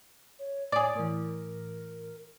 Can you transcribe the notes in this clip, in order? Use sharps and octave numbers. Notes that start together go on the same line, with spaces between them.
C#5
A2 G#4 C#5 D5
A2 E3 A#4